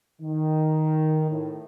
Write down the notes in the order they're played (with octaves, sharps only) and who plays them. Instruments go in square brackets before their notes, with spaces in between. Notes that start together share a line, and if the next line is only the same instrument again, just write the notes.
[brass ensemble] D#3
A2